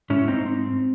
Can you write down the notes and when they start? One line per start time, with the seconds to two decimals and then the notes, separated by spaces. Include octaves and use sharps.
0.10 G#2 C#4 E4
0.28 C4 D#4
0.46 C4